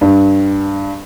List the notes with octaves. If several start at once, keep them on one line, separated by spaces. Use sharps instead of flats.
G2